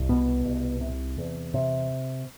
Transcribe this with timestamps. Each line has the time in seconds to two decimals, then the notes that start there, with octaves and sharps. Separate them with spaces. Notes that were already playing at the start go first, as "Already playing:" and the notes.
Already playing: C2
0.09 B2 B3
0.45 C2
0.81 C3
1.18 E2
1.54 C3